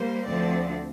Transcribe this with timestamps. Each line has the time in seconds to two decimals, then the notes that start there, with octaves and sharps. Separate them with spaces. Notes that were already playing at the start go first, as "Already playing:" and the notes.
Already playing: G3 A#3 C5
0.26 D2 D3 F3 C4 D5